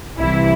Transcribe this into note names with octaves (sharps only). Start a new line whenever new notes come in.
C2 C3 E3 E4